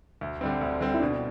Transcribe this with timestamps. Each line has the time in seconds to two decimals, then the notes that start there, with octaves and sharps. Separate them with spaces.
0.21 D2
0.41 D3 G3 C4
0.61 D2
0.81 D3 G3 C4
0.94 E4
1.00 B2 D4